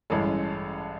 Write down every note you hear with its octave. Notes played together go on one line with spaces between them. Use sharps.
A1 G2 E3 G#3 C#4 A4